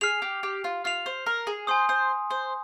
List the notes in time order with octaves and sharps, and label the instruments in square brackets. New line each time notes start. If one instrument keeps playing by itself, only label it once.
[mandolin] G#4 [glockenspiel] F6 C7 F7
[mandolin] G4
G4
F4
[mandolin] F4 [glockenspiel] F6 C7 F7
[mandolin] C5
A#4
G#4
[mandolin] C5 [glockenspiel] G#5 C6 D#6
[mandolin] C5
C5